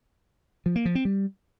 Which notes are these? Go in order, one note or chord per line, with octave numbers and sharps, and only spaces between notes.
F3
A#3
F3
C4
G3